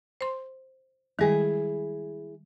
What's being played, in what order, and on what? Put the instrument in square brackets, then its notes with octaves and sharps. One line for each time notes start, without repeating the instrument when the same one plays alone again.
[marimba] C5 C6
[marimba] D#3 G3 G#3 [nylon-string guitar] E4 G#4